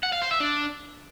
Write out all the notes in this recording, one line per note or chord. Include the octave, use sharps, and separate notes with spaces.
F#5
F5
C5
E5
D4